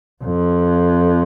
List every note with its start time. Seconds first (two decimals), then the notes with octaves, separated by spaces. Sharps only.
0.24 F2